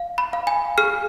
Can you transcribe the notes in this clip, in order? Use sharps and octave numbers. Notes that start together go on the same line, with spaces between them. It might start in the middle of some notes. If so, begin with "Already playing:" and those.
Already playing: F5
B5
F5
G#5
G#4 F6